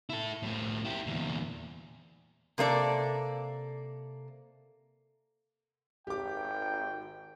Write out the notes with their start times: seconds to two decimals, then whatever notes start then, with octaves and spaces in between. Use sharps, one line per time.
0.10 E4 A4
0.43 A2 F3
0.84 E4 G4
1.07 E2 A#2
2.58 C3 A#3 A4 D5
6.07 G#1 G4 G5 D6